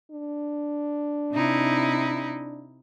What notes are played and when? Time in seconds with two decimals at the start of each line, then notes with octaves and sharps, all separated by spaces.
0.11 D4
1.33 C3 D#4 E4